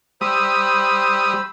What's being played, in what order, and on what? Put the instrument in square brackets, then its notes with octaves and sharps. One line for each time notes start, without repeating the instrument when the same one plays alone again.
[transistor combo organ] G3 D#6 [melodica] C5 B5 E6